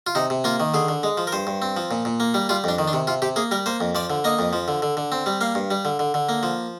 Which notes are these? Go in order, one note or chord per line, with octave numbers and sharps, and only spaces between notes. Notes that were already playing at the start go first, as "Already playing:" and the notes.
F4
C3 D#4
C3
A#3 F4
D#3
D3 G#4
D3
G#3
F3
A#4
G2 C5
G2
C4
F3
A#2
A#2
A#3
G3
G3 F4
F2 D4
D#3
D4
C3
C3 F4
C3 G4
A#3 G#4
G3 A#4
A#3 C5
F2
F3 D5
D3
A#3 D#5
F2
F3
D3
D3
D3
C4
G3
A#3 F5
G2
G3
D3
D3
D3
A#3
F3